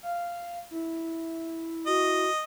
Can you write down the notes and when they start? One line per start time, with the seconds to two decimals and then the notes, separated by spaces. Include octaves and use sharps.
0.03 F5
0.71 E4
1.87 F#4 D#5